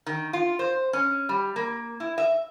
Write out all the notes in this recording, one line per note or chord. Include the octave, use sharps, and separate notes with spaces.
D#3
F4
C5
C#4
G3
A#3
E4
E5